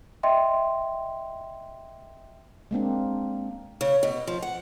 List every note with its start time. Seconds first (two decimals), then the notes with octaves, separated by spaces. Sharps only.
0.23 D#5 E5 G5 C6
2.71 G#3 A#3 C4 D4
3.81 C#3
4.03 B2
4.27 F3
4.42 F#5